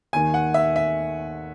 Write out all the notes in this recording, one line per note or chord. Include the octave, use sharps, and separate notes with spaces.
D#2 D#3 G#5
F#5
E5
E5